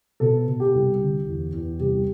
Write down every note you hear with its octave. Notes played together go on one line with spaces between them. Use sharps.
B2 A4
B2
G4
C2
D3
E2
E2
C2 G4